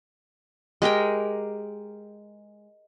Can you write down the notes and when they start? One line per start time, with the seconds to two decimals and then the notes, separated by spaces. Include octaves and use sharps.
0.82 G#3 G4 A#4 G5